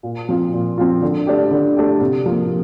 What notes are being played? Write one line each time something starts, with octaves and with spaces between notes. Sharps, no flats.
A#2
F3 C4 F4
A#2
F3 C4 F4
D3
A3 D4 G4
D3
A3 D4 G4
C3
F3 A#3